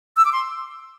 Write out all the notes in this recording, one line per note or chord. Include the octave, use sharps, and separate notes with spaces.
E6
D6
C6